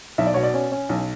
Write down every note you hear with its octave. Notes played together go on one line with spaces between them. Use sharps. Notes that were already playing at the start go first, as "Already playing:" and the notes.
B1 E5
D5
B2 C#5
D5
C#4
C#4
B1